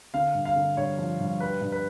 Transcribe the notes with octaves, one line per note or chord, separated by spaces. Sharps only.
D3 F5
G2
F5
D3
G2 C#5
F3
G2
G3 B4
G2
B4